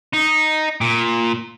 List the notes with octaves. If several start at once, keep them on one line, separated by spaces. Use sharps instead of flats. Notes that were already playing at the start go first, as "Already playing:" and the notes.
D#4
A#2